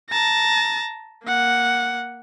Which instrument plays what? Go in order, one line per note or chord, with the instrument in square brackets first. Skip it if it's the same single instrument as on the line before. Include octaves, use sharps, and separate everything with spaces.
[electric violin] A5 A#5
A#3 F#5